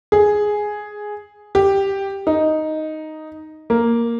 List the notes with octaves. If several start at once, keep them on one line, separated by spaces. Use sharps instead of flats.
G#4
G4
D#4
A#3